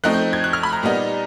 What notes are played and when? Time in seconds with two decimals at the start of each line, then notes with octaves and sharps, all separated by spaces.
0.04 F3 A3 C4 D#4 F#6
0.14 G6
0.33 G#6
0.44 F#6
0.53 F6
0.63 B5
0.73 A#5
0.83 A#2 G3 B3 D#4